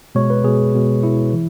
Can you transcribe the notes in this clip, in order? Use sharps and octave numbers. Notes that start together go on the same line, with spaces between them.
B2 G#3 C#5
B4
B2 G#3 G#4
B2 G#3
B2 G#3 E4
E3